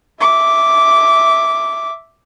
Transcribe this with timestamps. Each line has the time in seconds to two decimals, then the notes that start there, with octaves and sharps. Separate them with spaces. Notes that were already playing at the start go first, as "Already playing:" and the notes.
0.21 E5 D6